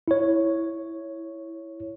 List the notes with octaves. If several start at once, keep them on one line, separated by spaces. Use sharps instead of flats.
E4 C#5